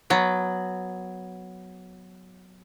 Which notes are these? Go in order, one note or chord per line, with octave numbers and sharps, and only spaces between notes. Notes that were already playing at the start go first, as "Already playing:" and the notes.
F#3 B3